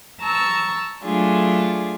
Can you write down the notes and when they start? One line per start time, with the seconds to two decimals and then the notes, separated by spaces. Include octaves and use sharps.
0.20 A5 A#5 C#6 E6
1.04 F#3 A3 D4 F4 G#4